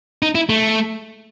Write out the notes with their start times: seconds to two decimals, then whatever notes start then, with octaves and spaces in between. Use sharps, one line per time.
0.22 D#4
0.35 E4
0.49 A3